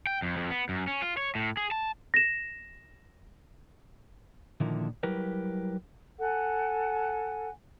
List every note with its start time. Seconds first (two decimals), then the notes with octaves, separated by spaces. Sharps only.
0.07 G5
0.22 F2
0.37 F2
0.50 B3
0.69 F#2
0.87 C#4
1.02 F4
1.17 C#5
1.35 A2
1.57 G#4
1.72 A5
2.14 A#6 E7
4.60 A#2 D3 D#3 F3 A#3 E4
5.03 F#3 G3 E4 G4 A#4 B4
6.19 A4 F#5 G#5